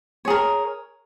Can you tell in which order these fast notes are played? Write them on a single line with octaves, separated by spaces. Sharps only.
C#5 G#4 A#4